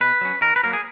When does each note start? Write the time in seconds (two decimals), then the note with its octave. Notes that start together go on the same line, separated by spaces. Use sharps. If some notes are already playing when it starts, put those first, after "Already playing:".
0.01 B2 B4
0.21 F#3 C#4
0.41 D#3 A#4
0.56 B4
0.63 F#3 A#3 A#4
0.73 G#4